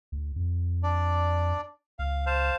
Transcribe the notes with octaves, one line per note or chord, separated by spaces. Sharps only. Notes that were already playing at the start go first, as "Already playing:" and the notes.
D2
F2
D4 D5
C#2 F5
C5 F5 A5